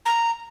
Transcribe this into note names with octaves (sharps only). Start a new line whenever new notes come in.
A#5